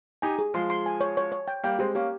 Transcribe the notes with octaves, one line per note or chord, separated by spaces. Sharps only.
D#4 G4 G#5
G#4
F3 G#3 C6
C6
G#5
C#5
C#5
C#5
G5
G3 A#3 G5
G#3 C4 G4
A#3 C#4 G4